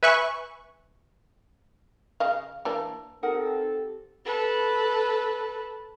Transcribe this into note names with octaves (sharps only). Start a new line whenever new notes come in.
B4 E5 G#5 C#6 F#6
C#3 D#5 F5
E3 A#3 D4
C4 D#4 G4 A4 A#4 F#5
A4 B4